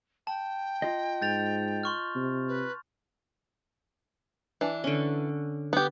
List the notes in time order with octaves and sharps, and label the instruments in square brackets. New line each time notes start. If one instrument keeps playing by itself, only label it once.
[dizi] G5 [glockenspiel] A5
[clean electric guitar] F4 D#5
[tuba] G#2 [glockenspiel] G6 A6 F7
[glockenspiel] C6 C#6 F6
[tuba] C3
[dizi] B4
[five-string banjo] E3 D4
[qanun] D3 C#4
[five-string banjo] B3 G4